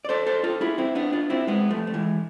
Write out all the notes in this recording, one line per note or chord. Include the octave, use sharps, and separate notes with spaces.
D5
A4 C5
A4 C5
F4 A4
E4 G#4
C4 E4
B3 D4
D4 F4
C4 E4
G#3 B3
F3 A3
A3
E3 G#3